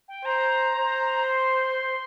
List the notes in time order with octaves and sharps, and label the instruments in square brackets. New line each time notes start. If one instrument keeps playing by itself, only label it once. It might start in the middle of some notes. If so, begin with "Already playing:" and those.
[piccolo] G5
[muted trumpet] C5 [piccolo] A#5
[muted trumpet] C5
[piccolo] C6